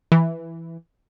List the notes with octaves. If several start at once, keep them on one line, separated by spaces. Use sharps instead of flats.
E3